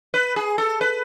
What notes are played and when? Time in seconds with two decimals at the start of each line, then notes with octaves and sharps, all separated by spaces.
0.14 B4
0.36 G#4
0.58 A4
0.81 B4